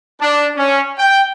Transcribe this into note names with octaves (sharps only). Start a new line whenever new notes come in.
D4
C#4
G5